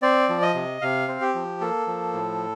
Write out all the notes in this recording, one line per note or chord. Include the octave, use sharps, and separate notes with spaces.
C4 D5
F3
D#5
C3
C3 F5
C4
G4
F3
A#3 A4
F3
A2